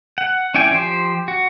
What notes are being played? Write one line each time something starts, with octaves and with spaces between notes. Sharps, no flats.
F#5
C#4 E4 D5 G5 G#5
F3 G4 C5
F#4